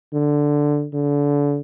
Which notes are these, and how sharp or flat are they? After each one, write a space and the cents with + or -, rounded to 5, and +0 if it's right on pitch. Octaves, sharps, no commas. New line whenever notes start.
D3 +0
D3 -30